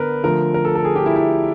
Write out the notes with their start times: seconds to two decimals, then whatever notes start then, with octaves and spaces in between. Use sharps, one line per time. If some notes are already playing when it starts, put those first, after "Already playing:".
Already playing: D3 B3 A#4 B4
0.24 D3 F3 A3 A#4
0.54 A#4
0.65 A4
0.75 A4
0.85 G#4
0.96 G4
1.06 E4
1.16 E4